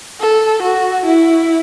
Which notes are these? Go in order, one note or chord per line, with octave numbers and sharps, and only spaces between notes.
A4
F#4
E4